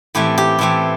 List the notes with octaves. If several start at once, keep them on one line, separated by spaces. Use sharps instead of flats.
A2 E3 A3 C4 G4
G4
A2 E3 A3 C4 G4